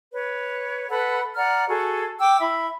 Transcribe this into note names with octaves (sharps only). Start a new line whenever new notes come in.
B4 C#5
A4 B4 F#5 B5
D5 F#5 A#5 F6
F#4 G#4 A4
G5 D6 E6
E4 E5 B5